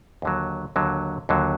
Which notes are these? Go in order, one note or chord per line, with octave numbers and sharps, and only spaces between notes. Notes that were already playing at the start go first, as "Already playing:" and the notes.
D#2 D3 F#3
D#2 D3 F#3
D#2 D3 F#3